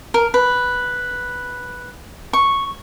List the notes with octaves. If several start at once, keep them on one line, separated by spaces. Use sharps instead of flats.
A#4
B4
C#6